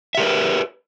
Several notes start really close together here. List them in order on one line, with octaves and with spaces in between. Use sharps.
E5 G4 A#4 B4